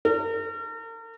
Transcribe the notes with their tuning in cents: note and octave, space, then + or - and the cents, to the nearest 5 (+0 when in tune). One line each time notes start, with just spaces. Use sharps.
A#4 -40